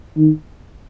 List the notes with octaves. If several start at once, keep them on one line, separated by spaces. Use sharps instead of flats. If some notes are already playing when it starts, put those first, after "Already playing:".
D#3